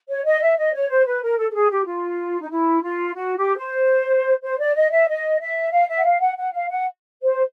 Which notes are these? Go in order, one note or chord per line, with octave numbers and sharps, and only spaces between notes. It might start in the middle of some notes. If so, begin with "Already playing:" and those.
C#5
D#5
E5
D#5
C#5
C5
B4
A#4
A4
A4
G#4
G4
F4
D#4
E4
F4
F#4
G4
C5
C5
D5
D#5
E5
D#5
E5
F5
E5
F#5
F5
F#5
F#5
F5
F#5
C5